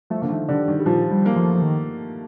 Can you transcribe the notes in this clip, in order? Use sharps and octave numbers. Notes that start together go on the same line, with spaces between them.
F3 A3
D3 A#3
D#3 A3
D3 G3
D#3
G3
A#2 F3
G3
A#3
F3 A3
F3
D#3